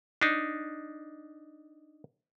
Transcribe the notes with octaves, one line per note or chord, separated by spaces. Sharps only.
D4 D#4